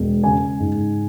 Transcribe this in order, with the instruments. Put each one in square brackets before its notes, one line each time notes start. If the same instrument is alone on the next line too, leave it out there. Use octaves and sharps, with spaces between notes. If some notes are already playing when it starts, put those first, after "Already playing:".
Already playing: [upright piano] E1 G#3
C#3 G#5
G#2